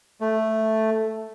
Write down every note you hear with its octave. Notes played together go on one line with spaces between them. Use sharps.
A3